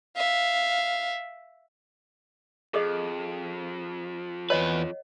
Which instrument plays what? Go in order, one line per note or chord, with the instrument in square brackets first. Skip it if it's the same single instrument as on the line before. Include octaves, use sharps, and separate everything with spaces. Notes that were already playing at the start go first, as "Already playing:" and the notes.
[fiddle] E5 F5
[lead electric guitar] F2 [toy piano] G#4 A4 D#5
[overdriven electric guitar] E2 B4 [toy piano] C#5 D#5 F#5